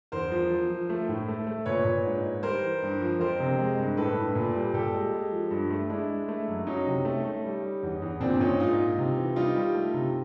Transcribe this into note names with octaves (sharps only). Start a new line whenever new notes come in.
E2 A#4 C5
F3
F3
F3
A3
A2
A3
A3
A#2 B4 C#5
A#2
G#2
G#2
G3 A#4 C5
E3
G2
F3
F2 A#4 C5
C3
G#3
G2
A2 A4 B4
A2
A#2
G3
A#2 G4 A4
G#3
G#3
F3
G2
A3
G#3 D4 E4
G#3
A3
F#2
F#3 C#4 D#4
C3
A3
A3
G3
G3
E2
E2
A#2 C4 D4
A#2 C#4 D#4
G#2 D#4 F4
G#2
C3
E3
G3 D#4 F4
G3
A3
C3